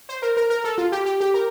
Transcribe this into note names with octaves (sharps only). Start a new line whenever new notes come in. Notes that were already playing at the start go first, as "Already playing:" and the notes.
C5
A#4
A#4
A#4
A4
F4
G4
G4
G4
A#4